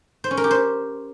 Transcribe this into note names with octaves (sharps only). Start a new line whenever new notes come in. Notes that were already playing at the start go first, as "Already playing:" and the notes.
C5
C#4
A#4
G4
C5